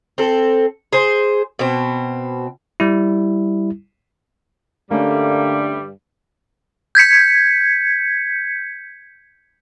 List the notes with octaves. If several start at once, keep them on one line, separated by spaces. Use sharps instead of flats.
C4 A4
G#4 C5
B2 C4
G3 E4
G2 D3 G3 A3 A#3 C#4 D4
G6 G#6 B6 C#7